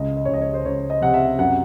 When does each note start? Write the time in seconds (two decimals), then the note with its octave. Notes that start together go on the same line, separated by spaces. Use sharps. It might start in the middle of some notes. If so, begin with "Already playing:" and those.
Already playing: C#2 D#5
0.17 D#5
0.25 C#2 C#5
0.34 D#5
0.42 C#5
0.54 C5
0.65 C#2 C#5
0.90 D#5
1.02 C3 F#5
1.14 E5
1.39 F#2 F#5